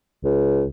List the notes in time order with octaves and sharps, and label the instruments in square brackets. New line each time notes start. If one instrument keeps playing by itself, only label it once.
[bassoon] C#2